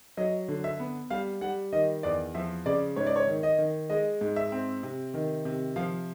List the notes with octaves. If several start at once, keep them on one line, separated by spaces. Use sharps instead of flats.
F#3 D#5
D3
E5
B3
G3 F5
G3 F#5
D#3 D#5
E2 D5
F3 E5
C#3 D5
G#2 C#5
D5
C#5
D#3
D#5
D#3
G#3 D#5
G#2
E5
C4
C3
D#3
C3
F3 F5